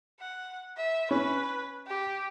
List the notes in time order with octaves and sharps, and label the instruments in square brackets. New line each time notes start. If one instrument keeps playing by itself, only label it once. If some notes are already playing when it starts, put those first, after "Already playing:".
[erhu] F#5
E5
[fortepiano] C#4 [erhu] B4
[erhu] G4